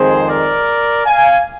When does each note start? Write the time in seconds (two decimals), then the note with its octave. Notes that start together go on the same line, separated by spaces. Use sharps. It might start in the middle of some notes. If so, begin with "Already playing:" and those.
Already playing: F2 D#3 G#3 C4 G#4 C5
0.28 A#4 D5
1.05 F5 G#5